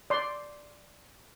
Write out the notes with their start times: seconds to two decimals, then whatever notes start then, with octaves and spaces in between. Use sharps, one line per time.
0.10 D5 C6